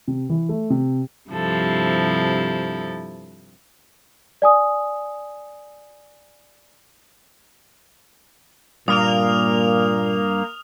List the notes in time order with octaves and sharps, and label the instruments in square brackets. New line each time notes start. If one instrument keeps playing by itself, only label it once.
[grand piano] C3
E3
A3
C3
[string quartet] G2 C3 F3 E4 A4
[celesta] D5 G#5 D#6
[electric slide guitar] G2 [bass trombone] A#2 [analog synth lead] A#3 [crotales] D#6 F6 F7